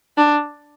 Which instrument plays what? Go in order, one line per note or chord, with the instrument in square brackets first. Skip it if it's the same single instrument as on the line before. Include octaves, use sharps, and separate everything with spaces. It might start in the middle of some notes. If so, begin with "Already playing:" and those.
[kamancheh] D4